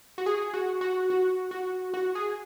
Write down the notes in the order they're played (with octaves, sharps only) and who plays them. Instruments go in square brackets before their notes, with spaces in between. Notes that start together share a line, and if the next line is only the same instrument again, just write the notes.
[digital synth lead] F#4
G#4
F#4
F#4
F#4
F#4
F#4
G#4